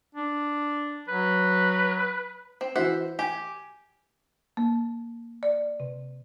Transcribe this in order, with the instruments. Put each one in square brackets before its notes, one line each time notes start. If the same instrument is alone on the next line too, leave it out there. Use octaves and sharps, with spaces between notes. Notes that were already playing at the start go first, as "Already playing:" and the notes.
[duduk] D4
[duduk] F#3 [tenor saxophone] B4
[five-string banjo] C4
[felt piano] E3 F#4 [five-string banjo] C5 E5 F#5
[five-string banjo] G4 [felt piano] G#5
[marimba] A#3
D5
C3